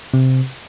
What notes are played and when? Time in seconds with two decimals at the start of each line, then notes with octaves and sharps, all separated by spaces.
0.14 C3